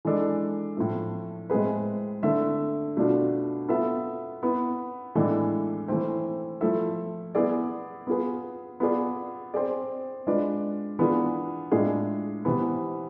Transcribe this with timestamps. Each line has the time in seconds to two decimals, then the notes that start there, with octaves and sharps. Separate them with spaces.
0.05 E3 G#3 D4 A4
0.77 A2 F3 A3
1.50 A2 G#3 C4 G#4 B4
2.23 D3 A3 E4 A4 E5
2.97 B2 A3 D4 F4
3.69 B3 F4 A4 E5
4.43 B3 E4 B4
5.15 A2 E3 G#3 D4 A4
5.88 E3 A3 C4
6.61 F3 A3 E4 A4 E5
7.35 B3 E4 G#4 D5
8.07 B3 F4 G#4 B4
8.80 B3 F4 G#4 D5
9.54 C4 G#4 D5
10.27 G#3 D4 F4 B4 D5
10.99 E3 B3 D4 F4 G#4
11.72 A2 G#3 D4 F4 G#4
12.45 C3 E3 B3